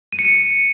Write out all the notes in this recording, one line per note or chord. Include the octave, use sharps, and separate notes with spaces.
D#7
C#7
D#7